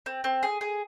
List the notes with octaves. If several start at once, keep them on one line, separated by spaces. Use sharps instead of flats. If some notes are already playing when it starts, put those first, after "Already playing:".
C4
C4
G#4
G#4